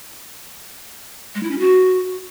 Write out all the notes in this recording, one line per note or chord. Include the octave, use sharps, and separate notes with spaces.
G#3
E4
C#4
F#4